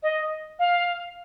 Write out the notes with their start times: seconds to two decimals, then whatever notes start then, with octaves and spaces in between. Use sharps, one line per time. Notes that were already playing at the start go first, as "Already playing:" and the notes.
0.03 D#5
0.59 F5